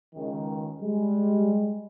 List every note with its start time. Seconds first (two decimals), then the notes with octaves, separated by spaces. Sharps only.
0.14 C#2 D#3
0.81 G3 G#3